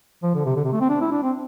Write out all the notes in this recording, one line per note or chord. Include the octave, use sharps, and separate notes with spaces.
F3
D3
C3
D3
C3
A3
C4
D4
E4
D4
C4